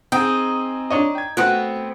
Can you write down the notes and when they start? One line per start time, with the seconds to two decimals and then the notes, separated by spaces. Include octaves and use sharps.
0.12 C4 D#4 G#4 G5
0.91 D4 C#5 D#5
1.15 G5 G#6
1.37 A3 B3 C4 F#4 F#5 F#6